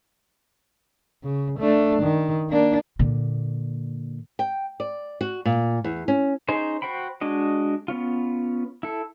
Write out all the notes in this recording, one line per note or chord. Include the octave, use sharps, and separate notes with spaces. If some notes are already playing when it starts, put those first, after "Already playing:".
C#3
A3 D4
D#3
A#3 D4
A#2 D3
G5
D5
F#4
A#2
E2
C#4
C#4 D#4 G#4 C5
F#4 C5 G5 B5
G#3 D4 F#4 D#5
B3 C#4 F4
E4 A4